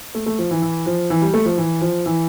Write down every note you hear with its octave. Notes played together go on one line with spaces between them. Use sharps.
A3
A3
F3
E3
E3
F3
E3
G3
A3
F3
E3
F3
E3